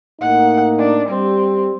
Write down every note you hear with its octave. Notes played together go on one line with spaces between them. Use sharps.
A2 A#3 D#4 F#5
D4
G3 C4